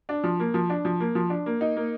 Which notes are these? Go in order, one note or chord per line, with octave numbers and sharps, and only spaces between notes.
D4
F3
A#3
F3
D4
F3
A#3
F3
D4
A#3
D#4
A#3